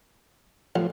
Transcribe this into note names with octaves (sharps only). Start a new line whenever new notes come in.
A1 F3